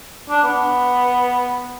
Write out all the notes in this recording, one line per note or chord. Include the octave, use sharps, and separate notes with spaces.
D4
B3